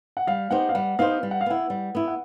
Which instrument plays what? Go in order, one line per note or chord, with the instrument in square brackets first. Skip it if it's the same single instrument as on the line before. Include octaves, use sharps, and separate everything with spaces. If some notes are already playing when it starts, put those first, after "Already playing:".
[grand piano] F#5
[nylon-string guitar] G3 [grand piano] F5
[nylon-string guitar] B3 D#4 G4 C5 [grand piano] F#5
[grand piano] F5
[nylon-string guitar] G3 [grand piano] F#5
[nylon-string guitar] B3 D#4 G4 C5 [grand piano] F5
[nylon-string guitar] G3
[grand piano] F#5
F5
[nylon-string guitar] B3 E4 [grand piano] F#5
[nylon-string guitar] G3
B3 E4
[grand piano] F#5